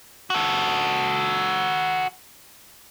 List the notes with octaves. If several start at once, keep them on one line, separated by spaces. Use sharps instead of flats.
F#4 A4